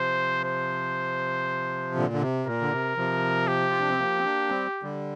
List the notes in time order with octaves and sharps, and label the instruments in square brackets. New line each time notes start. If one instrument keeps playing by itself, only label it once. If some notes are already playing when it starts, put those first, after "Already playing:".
Already playing: [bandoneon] C3 F3 [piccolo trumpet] C5
[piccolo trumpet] C5
[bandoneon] A#2 D3
D3
C3
[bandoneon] A#2 [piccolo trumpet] A#4
[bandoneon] D3
C3
C3 F3
[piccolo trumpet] G4
[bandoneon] F4
D4
C4
F3 A#3
C4
A#3 D4
G3 C4
D3 G3